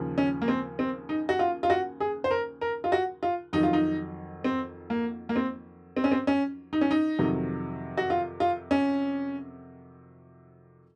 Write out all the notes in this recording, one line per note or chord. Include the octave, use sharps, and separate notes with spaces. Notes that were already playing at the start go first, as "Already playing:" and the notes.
Already playing: D#2 C#3 F3
C#4
A#3
C4
C4
D#4
F#4
F4
F4
F#4
G#4
C5
A#4
A#4
F4
F#4
F4
F2 D#3 F#3 D#4
F4
D#4
C4
A#3
A#3
C4
C4
C#4
C4
C#4
D#4
C#4
D#4
F2 C3 D#3 F#3
F#4
F4
F4
C#4